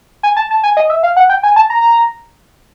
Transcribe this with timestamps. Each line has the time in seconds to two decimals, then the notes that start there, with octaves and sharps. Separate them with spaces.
0.23 G#5
0.37 A5
0.51 A5
0.63 G#5
0.77 D#5
0.90 E5
1.03 F5
1.17 F#5
1.30 G5
1.43 G#5
1.56 A5
1.70 A#5